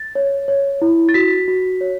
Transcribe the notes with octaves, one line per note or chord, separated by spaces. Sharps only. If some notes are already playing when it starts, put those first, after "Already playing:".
Already playing: A6
C#5
C#5
E4
A6
F#4 B6
F#4
C#5